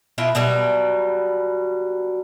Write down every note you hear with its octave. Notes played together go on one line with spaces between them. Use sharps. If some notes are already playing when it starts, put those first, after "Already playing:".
B2 E4 F4 E5
B2 F#3 G3